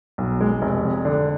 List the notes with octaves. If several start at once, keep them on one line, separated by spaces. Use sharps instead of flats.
B1
G#3
F1
F2
D3